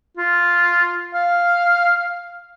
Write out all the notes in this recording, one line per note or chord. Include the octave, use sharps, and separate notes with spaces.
F4
F5